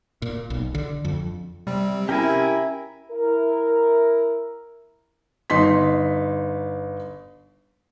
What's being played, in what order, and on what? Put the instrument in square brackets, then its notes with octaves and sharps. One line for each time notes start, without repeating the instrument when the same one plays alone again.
[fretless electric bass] A#2
B1
D3
F2
[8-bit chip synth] C3 C4 [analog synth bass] G3
[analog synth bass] C#4 [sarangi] E4 [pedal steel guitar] G4 A#4 G#5
[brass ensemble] E4 A#4
[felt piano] G1 D#4 C6 B6